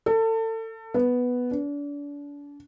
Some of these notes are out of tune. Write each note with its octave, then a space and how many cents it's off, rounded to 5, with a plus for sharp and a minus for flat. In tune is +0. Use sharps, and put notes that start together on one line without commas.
A4 +30
B3 +0
D4 -35